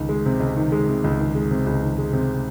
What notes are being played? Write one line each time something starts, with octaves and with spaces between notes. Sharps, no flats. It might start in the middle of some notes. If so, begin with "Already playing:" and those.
Already playing: C#2 D#3
G#3
C3
C#2
D#3
G#3
C3
C#2
D#3
G#3
C3
C#2
D#3
G#3
C3